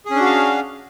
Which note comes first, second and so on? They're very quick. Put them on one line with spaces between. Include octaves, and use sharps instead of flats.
G#4 C#4 D4 F#4 F5